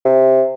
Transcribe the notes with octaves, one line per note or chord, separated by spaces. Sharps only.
C3